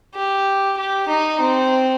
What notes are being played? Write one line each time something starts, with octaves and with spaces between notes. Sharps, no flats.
G4
G4
D#4
C4